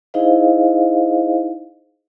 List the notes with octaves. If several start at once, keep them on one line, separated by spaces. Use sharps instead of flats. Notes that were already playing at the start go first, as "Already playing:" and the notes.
D#4 E4 G#4 C5 D#5 F5